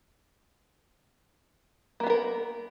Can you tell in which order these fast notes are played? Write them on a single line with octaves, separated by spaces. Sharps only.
A#3 B3 G#4 A#4